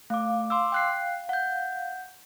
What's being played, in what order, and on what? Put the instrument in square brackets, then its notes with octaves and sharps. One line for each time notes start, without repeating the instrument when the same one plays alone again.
[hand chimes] A3 D6 [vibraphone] F5
[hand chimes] C6 D6 E6
G5 F#6 C7
F#5 G6